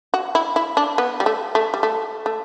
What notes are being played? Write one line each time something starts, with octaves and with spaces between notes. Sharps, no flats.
F#4
E4
E4
D4
B3
G3
A3
A3
G3
A3
A3